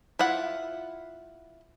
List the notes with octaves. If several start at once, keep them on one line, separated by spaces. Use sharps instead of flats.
E4 F4 F#5